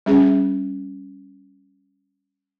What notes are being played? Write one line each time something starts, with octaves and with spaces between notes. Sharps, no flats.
G3 C#4 G#4